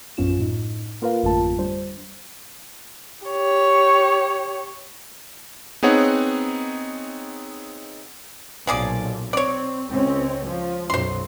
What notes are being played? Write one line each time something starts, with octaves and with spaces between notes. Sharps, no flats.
A#1 F#2 B3 C#4 F4 E7
A2 D#4
A#3 F4 A#4 B4 F5
G#1 F2 D3 A3 F4 A5
G3 D4 C5
G4 C#5
B3 C4 D#4 G#4 C#5 F#5
B1 A#2 F3 G#4 D5
C4 C#5 D5
C#2 C4 C#4
F3
B1 F#2 F#3 C5 C6